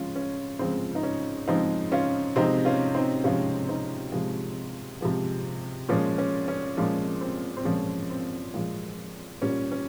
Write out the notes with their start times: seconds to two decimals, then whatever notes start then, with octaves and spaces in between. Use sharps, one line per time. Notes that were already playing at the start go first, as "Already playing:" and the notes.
Already playing: C#3 F3 G#3 C#4 F4
0.16 C#4
0.59 C#3 F3 G#3 C4
0.95 D#4
1.03 C#4
1.48 C#3 F3 G#3 C4 D#4
1.92 C#4 F4
2.36 C3 F3 G#3 C4 D#4
2.65 C#4 F4
2.95 C4 D#4
3.24 C3 F3 G#3 C#4 F4
3.68 C4 D#4
4.12 C3 F3 G#3
5.01 C3 F3 G#3
5.89 A#2 F3 G#3 C#4
6.18 C#4
6.48 C#4
6.77 A#2 F3 G#3 C#4
7.21 C4
7.57 C4
7.65 A#2 F3 G#3 C#4
8.10 C4
8.54 A#2 F3 G#3
9.42 A#2 G3 C#4
9.72 C#4